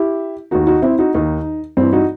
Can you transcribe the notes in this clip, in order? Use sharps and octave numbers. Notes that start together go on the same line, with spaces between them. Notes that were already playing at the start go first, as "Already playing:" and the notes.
Already playing: E4 G4
D#2 D#3 D#4 F#4
D#4 F#4
C4 E4
D#4 F#4
D#2 D#3 D#4
G2 E3 C4
D#4 F#4